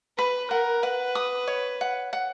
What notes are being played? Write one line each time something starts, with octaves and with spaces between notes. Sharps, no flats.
B4 B5
A#4 F#5
B4 F#5
D#6
C#5
F#5
F#5